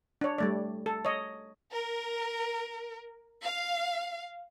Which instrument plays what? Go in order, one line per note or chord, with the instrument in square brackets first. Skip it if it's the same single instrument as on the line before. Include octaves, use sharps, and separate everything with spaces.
[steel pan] D4 C#5
G3 A3 D5
A4
C#5 D#5
[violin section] A#4
F5